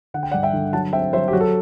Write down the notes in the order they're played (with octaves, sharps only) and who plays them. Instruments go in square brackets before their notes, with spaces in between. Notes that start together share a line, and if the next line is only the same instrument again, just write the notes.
[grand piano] D3 F#5
G5
D5 F#5
G2
E5 G5
D3
F#3 F#5 A5
C4 E5 G5
F#3 C5 E5
G4
F#3 F#4
A4